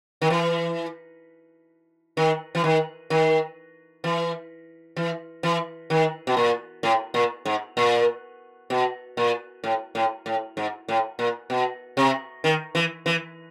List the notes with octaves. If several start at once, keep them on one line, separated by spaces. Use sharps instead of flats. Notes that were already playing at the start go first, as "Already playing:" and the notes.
D#3
E3
D#3
E3
D#3
D#3
E3
E3
E3
D#3
B2
A#2
A2
A#2
G#2
A#2
B2
A#2
A2
A2
A2
G#2
A2
A#2
B2
C3
D#3
E3
E3